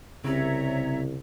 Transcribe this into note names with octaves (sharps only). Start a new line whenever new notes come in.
C2 C#3 C4 C#5 E5 A#5